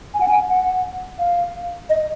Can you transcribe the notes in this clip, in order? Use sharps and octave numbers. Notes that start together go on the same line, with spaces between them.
G#5
F#5
G#5
F#5
F5
D#5